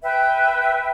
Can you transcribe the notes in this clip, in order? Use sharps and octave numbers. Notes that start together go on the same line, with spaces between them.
B4 E5 G5